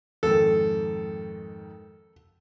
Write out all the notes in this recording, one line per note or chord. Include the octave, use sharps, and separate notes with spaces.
F2 G#2 D#3 A4